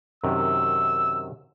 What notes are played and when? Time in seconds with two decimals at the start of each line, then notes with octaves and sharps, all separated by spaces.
0.24 F#2 C3 D#3 E6